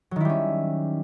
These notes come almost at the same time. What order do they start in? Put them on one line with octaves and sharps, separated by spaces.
F#3 D#3 E4 G3 C#4